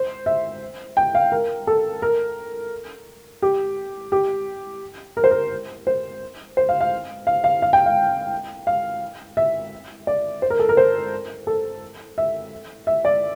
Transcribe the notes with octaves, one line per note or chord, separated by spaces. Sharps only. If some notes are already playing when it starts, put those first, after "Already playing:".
Already playing: C5
E5
G5
F5
A#4
A4
A#4
G4
G4
A#4
C5
A#4
C5
C5
F5
F5
F5
F5
F5
G5
F5
F5
E5
D5
C5
A#4
A4
A#4
C5
A4
E5
E5
D5